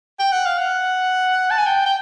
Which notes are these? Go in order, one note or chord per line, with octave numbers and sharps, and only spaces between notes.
G5
F#5
F5
F#5
A5
G#5
G5
G5